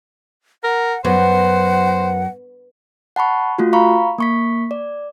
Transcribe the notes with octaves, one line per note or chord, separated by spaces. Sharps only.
A#4 F#5
F#2 B3 C5 F#5
F#5 A5 B5 C#6
A3 F4 F#4
F5 A#5 B5 C#6
A#3 C#6 B6
D5